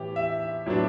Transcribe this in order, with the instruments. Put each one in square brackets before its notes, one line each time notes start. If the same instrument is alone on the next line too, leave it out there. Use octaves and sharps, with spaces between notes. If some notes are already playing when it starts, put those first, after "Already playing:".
Already playing: [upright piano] A2 E3 B3 G4
E5
A2 F#3 B3 D4